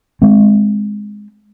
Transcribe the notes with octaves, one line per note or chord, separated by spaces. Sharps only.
G#3 C4